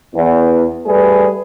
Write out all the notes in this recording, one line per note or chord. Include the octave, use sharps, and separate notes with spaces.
E2
G3 A3 G#4 B4